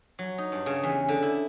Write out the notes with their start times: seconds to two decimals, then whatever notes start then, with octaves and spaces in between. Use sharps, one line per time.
0.19 F#3
0.38 D#4
0.52 G2
0.66 C#3
0.84 E2
1.08 D3
1.23 E4